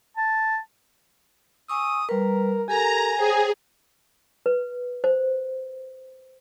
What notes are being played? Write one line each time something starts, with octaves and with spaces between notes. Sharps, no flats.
A5
G#5 C#6 D#6 E6
G3 A#4 B4
G4 A4 A#4 G#5 A#5
G#4 C5 C#5 G5
B4
C5